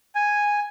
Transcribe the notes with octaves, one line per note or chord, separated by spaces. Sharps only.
G#5